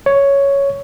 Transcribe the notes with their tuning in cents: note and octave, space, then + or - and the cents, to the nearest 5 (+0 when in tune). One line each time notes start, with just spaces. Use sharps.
C#5 +5